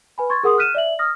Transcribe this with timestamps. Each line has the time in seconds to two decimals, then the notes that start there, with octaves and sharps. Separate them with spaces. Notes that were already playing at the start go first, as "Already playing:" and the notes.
0.18 B4 G#5 B5
0.30 C6 C#6 G#6 A6
0.43 G#4 A#4 F#5 C6 D#6
0.58 F6 F#6 B6 D#7 E7
0.75 D5 E5 F#7
0.99 D#6 F6 A#6